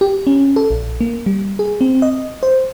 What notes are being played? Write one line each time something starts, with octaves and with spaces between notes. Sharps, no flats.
G4
C#4
A4
A#1
A#3
G3
G#4
C4
D#5
C5